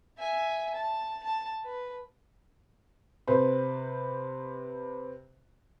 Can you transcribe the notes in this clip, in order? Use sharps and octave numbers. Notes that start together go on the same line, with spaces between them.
E5 G#5
A5
A5
B4
C3 B4 C5